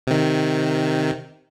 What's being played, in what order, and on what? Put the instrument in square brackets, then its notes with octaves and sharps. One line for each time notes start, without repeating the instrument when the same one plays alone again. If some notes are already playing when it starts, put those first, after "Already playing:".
[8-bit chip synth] C3 D#3